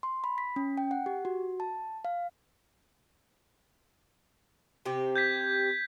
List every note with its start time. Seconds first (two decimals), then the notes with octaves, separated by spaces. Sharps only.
0.03 C6
0.24 B5
0.38 B6
0.56 C#4
0.77 G5
0.91 F#5
1.06 G4
1.25 F#4
1.60 A5
2.05 F5
4.85 C3 C4 G4
5.16 G6 G#6 B6